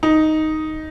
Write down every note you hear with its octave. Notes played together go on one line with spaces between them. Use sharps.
D#4